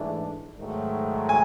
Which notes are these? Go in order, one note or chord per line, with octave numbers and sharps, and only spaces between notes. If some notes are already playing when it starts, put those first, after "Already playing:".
Already playing: G#2 E3 A3 D4
G#2 D#3 F#3 A3
G#5